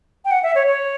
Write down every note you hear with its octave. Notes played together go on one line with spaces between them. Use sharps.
G5
F#5
E5
C#5
C#5